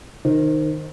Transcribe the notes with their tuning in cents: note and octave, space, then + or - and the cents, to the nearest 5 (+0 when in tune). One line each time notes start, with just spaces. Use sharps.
D#3 -15 C5 +0